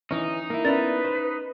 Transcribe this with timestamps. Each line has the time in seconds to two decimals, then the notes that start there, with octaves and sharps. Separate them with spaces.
0.11 E3 C#4 D#4
0.50 A#3 E4
0.65 B3 C#4 E4 A#4 B4 D5 A6
1.05 C5